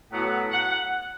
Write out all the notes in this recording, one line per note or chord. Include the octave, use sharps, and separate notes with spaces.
A2 F#3 B3 F#5
F#5